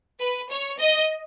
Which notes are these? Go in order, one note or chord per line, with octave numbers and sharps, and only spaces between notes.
B4
C#5
D#5